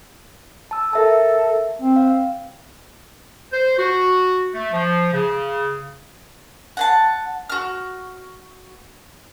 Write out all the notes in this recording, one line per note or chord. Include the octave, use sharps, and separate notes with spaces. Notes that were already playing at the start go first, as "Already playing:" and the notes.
A5 E6
A4 A#4 E5 A5
C4
F5
C5
F#4
A3
F3
C#3
F#5 G#5 A5
F#4 F6